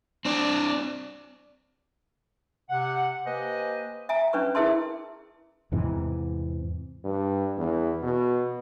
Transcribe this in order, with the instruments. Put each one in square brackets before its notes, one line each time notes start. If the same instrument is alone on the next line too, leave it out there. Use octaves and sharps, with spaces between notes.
[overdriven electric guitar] C4 D4
[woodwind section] C3 F#5
A#3 G4 B4 C5 D#5 G#5
[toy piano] E5 G#5 A#5
C#4 D4 B4 C#6
E4 G#4 A#4 E5 A5 C6
[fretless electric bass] E2 G#2 C3 E3
[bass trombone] G2
E2
B2